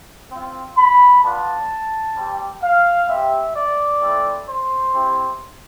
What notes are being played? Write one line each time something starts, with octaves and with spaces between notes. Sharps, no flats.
C4 F4
B5
B3 D4 F4 A5
G3 C4 G4
F5
G3 C4 G4 E5
D5
A3 C4 E4
C5
C4 E4 G4